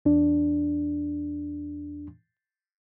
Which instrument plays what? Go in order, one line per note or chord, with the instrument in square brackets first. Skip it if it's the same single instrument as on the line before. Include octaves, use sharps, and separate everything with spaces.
[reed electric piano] E2 D4